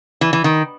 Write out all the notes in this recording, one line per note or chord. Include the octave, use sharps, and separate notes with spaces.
E3
E3
D#3